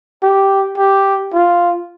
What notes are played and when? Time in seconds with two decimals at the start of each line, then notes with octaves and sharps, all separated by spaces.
0.22 G4
0.78 G4
1.34 F4